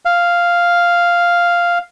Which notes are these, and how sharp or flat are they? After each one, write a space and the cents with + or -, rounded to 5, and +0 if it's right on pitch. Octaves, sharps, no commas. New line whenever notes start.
F5 -5